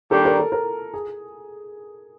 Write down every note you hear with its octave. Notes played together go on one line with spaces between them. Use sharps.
D#3 G3 A#3 D4 G4 A4
A#4
A4
A#4
G#4